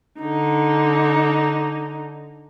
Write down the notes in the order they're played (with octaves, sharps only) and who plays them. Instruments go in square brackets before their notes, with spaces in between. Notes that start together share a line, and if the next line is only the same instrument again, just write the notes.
[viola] D3 D#4